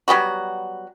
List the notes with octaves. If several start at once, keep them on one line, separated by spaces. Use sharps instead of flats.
F#3 G3 B3 F#4